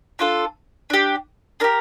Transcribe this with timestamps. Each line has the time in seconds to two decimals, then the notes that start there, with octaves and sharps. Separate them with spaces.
0.19 D4 F4 A4
0.90 D4 G4
1.60 D4 G4 A#4